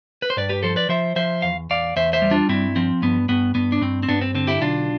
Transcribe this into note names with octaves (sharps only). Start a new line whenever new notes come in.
B4
C5
G2 B4 D5
G4 B4
F3 A4 C5
B4 D5
F3 C5 E5
F3 C5 E5
E2 F5
E2 D5 F5
E2 C5 E5
C5 E5
G3
D4 F4
G2 C4 E4
F3 C4
G2 B3
G2 B3
G2 B3
D4
G2 C4
C4
G2 B3 D4
C4
D3 C4
E4 G4
B1 D4 F4